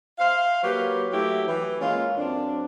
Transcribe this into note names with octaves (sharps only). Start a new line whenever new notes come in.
C5 E5 F5
F#3 A#3 G4 B4 C#5
F#3 A3 E4 G4
E3
G#3 A#3 C#4 F4
F#2 C4 D4